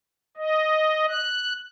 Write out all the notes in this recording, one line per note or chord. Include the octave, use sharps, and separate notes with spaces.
D#5
F#6